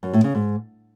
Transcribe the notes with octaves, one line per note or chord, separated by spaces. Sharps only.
F#2
A2
C#3
G#2